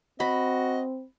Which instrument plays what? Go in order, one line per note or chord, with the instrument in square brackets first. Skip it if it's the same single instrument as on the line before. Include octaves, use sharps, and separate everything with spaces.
[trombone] C4 [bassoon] F#4 [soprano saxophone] D#5 [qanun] B5